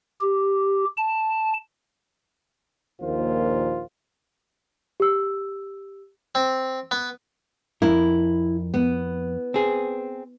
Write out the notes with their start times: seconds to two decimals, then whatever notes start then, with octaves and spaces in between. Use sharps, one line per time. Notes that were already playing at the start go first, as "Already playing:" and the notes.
0.20 G4
0.97 A5
3.01 A#1 D#2 A#2 F4 A#4 C5
5.00 G4 E6
6.35 C4
6.91 B3
7.82 F2 E4 A#4
8.74 B3
9.54 C4 G#4